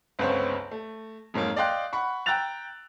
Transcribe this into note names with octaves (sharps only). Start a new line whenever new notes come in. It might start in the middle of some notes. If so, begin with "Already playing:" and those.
G1 C#2 B3 C4 C5 C#5
A3
F2 G#2 F#3 A#3
D5 D#5 F5 G5 C6 F#6
F#5 B5 C#6
G5 A#5 E6 F#6 A6 F7